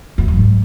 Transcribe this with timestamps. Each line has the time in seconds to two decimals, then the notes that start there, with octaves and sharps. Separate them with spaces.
0.18 E2
0.28 F#2
0.37 G#2